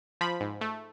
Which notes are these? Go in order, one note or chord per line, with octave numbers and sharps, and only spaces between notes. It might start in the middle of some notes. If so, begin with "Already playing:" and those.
F3 B5
G#2
A3